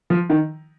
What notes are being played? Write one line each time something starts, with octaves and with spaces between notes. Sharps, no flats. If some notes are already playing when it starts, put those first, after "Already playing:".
F3
D#3